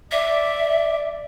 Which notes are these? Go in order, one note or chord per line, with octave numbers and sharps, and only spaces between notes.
D5 E5